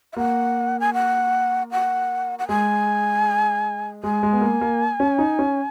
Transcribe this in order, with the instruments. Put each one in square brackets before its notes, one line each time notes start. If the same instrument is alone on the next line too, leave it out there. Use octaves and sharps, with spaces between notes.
[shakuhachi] E5
[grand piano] A#3 [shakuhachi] F#5
[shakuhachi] G#5
F#5
F#5
F#5
[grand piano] G#3 [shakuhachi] G#5
[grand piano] G#3 [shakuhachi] G#5
[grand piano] G#3
B3
A#3
A#3
C#4
D#4
C#4